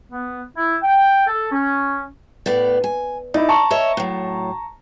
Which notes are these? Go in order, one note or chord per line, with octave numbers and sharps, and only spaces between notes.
B3
E4
G5
A4
C#4
A2 B3 D5
G#5
D#4 E4 D5
A5 A#5 C#6
C#5 D#5 E5
A2 F#3